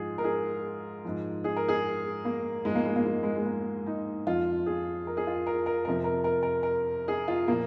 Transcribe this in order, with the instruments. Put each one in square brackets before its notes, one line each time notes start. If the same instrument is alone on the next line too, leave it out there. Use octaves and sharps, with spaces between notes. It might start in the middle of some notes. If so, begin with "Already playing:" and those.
Already playing: [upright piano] G#2 F3 F4 G#4
A#4
G#4
G#2 F3
G#4
A#4
G#4
A#3
G#2 F3 G#3
A#3
G#3
A#3
G#3
G#3
G#3
A#3
D#4
F2 F3 F4
G#4
A#4
G#4
F4
A#4
A#4
F2 C3 F3 A#4
A#4
A#4
A#4
A#4
G#4
F4
A#2 F3 A#3